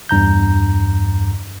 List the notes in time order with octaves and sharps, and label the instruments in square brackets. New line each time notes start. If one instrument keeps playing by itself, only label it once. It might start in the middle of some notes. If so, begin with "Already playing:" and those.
[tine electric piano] E2 G2 A#5 G6